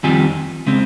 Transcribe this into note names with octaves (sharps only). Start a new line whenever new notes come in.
F2 D#3 G3 C4 F4 G#5
C#3 G#3 C4